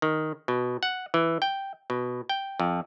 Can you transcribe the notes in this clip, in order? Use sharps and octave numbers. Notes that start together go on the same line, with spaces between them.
D#3
B2
F#5
E3
G5
B2
G5
F2